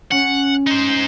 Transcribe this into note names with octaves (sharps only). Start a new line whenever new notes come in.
C#4 F#5
D#4 C5